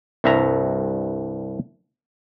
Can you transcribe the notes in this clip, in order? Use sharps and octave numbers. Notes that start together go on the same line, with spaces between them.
C2 G2 E5 A#5